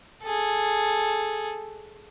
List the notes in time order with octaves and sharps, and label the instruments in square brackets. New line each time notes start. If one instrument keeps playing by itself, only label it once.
[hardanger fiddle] G#4 A4